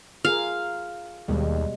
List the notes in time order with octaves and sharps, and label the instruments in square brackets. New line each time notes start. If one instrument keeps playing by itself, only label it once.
[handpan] F4 G#4 A#4 [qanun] F5
[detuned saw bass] D#2 [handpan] B2 G3 G#3